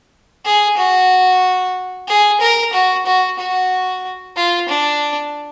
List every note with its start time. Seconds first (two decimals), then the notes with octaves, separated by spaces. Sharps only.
0.45 G#4
0.77 F#4
2.08 G#4
2.41 A#4
2.73 F#4
3.06 F#4
3.39 F#4
4.36 F4
4.69 D4